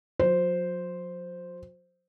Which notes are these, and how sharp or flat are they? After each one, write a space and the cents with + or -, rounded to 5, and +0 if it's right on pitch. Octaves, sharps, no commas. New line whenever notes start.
F#3 -45 C5 -5